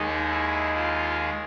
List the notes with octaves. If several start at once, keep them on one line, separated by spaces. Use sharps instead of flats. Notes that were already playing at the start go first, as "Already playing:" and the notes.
Already playing: D#2 D#3 G#3 D#4
E4
F4